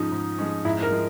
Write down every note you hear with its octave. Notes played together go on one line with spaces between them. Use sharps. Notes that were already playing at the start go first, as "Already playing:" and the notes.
Already playing: G#2 F3 G#3 C#4 D#4
G#2
F3 G#3 C#4
G#2 E4
A#4
F3 G#3